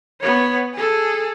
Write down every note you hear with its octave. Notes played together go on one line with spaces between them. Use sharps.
B3 C#5
G#4 A4